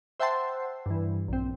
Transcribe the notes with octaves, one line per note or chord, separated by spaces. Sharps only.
C5 E5 F#5 G5 A5 C6
G2 E3
A#1 C4